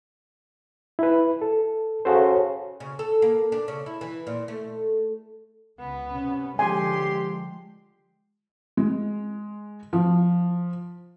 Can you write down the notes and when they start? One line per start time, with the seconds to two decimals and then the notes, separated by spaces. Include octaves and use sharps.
0.99 E4 B4
1.42 A4
2.05 C#3 F#4 A4 C5
2.80 C#3
2.99 A4
3.22 A#3
3.52 D4
3.68 C#3
3.86 E4
4.01 E3
4.27 A#2
4.48 A3
5.79 C#2 B3
6.11 C3 C#4
6.59 D3 F3 G#3 G4 G#5 C6
8.77 G#3
9.93 F3